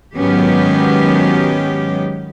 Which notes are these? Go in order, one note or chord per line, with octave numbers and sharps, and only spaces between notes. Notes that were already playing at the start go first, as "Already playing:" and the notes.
G#2 D#3 F#3 B3 C#4 G4